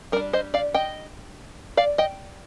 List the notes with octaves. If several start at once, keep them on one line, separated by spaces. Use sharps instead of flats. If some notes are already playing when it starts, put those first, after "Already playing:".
G3 D4 A#4 D5
C5 D#5
D5 F5
D#5 G5
D5 F5
D#5 G5